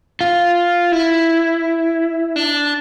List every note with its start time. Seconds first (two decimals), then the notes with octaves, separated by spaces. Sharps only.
0.21 F4
0.92 E4
2.36 D4